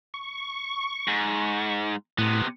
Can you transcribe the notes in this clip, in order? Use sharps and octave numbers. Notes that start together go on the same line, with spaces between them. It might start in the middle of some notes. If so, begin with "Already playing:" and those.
C#6
G#2
A2 C3 B3